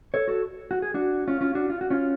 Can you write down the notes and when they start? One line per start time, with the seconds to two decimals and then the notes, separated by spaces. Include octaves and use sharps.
0.14 A4 C#5
0.28 F#4 A4
0.71 F#4
0.82 G#4
0.94 D4 F#4
1.27 C#4 F4
1.41 C#4 F4
1.55 D4 F#4
1.70 F4
1.81 F#4
1.90 C#4 F4